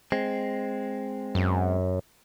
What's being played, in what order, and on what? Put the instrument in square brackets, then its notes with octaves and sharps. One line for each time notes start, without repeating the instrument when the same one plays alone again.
[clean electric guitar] G#3 C4
[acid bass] F#2